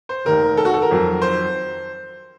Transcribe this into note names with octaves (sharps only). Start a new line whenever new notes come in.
C5
F1 D#2 D#3 A#4
A4
F#4
A4
A#4
F2 D#3 F#3
C5